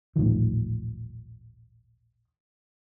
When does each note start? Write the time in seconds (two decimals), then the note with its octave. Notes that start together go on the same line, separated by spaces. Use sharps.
0.16 D#1 A1 D#3 F3